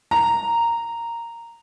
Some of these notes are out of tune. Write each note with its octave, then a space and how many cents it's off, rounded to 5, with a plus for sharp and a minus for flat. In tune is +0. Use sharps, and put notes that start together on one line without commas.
A#5 -5